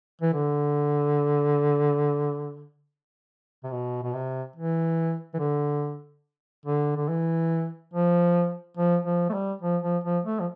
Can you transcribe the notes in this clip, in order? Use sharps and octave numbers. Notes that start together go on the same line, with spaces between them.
E3
D3
C3
B2
B2
C3
E3
E3
D3
D3
D3
E3
F3
F3
F3
A3
G3
F3
F3
F3
A3
F3